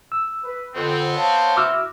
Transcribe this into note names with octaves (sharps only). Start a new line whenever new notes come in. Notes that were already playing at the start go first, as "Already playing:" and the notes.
E6
B4
F2 D3 B3 C4
C#5 F5 A5
E4 F#4 D6 E6 F6